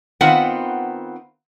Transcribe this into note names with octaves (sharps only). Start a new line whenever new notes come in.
D#3 B3 C4 F4 B4 F#5